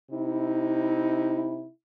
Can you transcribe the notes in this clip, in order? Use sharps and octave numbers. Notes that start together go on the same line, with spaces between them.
C3 D#4 E4